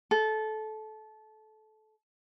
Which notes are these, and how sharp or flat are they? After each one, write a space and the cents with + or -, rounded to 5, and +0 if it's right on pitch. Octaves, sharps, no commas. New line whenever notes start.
A4 -20